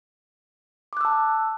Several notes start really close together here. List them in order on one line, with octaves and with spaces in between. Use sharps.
D6 F#6 E6 A5